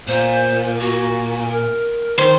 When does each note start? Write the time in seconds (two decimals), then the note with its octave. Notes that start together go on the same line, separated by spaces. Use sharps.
0.08 A#2 C5
0.80 F#4
1.48 A#4
2.19 D#3 C5